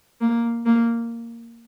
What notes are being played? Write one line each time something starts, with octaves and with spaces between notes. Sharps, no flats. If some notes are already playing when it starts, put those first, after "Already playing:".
A#3
A#3